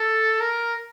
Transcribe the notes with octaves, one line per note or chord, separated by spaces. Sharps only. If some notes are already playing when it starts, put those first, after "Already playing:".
Already playing: A4
A#4